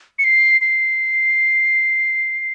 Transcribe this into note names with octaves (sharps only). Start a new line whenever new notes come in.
C#7
C7
C7